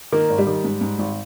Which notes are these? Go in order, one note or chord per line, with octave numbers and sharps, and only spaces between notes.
D#3 A#3
G#1
G3
D#3
G#2
G#2
G#1